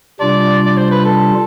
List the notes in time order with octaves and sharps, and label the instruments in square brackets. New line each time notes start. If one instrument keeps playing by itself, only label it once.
[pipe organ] C3 G3 D4 F4 [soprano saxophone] D5
[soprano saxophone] D5
C5
B4
A4